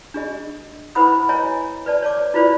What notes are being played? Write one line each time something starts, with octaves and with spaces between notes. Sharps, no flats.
D4 G#4 D#5
E4 B4 C5 F#5 B5 D#6
C#5 D#5 G#5 A#5
B4 D5 A5
C#5 A5 D6
E4 F4 B4 C5 D5